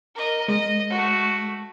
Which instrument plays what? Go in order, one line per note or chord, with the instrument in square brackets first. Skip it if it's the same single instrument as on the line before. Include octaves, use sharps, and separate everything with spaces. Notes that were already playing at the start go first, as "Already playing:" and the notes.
[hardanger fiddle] A#4 D#5
[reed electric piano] G#3 [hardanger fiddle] D#5
[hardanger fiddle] A3 F#4